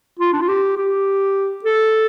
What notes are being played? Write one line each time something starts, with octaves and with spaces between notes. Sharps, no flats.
F4
D4
F4
G4
G4
A4